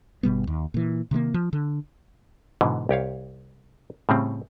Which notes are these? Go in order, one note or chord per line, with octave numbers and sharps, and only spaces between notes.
G1 B2 G3 B3
D#2
A#2 E3
C3 D#3 G#3 A#3
F3
D3
G#2 B2 D3 E3
C2 G4 C#5 F5
A2 C#3 G3 C4